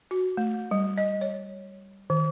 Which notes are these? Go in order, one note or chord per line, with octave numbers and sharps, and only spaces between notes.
F#4
A3
G3
D#5
C#5
D#3